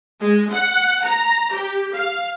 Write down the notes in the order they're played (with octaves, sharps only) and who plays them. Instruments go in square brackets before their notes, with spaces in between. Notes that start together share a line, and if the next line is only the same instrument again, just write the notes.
[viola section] G#3
F#5
A#5
G4
F5